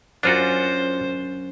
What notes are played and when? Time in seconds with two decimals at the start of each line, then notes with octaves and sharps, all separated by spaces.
0.23 F#2 D4 F4 F#4 C5